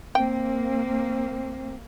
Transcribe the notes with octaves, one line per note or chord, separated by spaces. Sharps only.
A#3 C4 G5